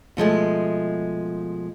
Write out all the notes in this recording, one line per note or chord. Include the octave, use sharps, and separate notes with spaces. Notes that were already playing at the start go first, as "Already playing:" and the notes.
B2 F3 G#3 A3